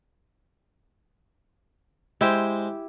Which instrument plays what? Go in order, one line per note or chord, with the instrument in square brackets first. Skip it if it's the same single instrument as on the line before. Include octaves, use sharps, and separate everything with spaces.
[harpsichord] G#3 C5 [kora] E4 G4